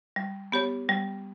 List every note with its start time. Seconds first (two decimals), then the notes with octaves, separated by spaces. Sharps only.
0.16 G3
0.52 B3 G4 C#5
0.89 G3